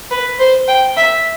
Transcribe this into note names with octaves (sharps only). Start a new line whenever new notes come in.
B4
C5
G5
E5